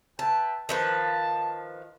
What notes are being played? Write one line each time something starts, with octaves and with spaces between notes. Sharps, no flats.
B4 E5 G5 A5
D#3 F3 B4 A5